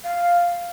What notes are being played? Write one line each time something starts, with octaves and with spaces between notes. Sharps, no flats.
F5